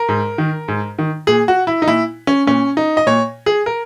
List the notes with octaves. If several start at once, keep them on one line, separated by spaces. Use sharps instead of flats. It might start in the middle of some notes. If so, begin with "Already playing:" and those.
Already playing: A#4
G#2
D#3
G#2
D#3
A#2 G#4
F#4
E4
D#4
A#2 E4
C#4
A#2 C#4
D#4
D#5
A#2 C#5
G#4
A#4